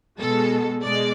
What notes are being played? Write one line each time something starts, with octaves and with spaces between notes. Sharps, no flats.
B2 G#3 A4
B2 G#3 D5